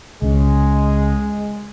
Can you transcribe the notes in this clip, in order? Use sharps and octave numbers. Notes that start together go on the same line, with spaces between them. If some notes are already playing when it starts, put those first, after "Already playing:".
C#2 C#3 G#3